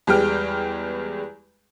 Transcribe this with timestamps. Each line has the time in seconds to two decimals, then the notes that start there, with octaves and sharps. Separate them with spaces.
0.07 E2 G3 G#3 B4 G5 F6